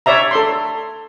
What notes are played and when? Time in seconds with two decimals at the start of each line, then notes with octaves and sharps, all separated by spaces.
0.06 C#5 D5 E5 A#5
0.31 A4 C6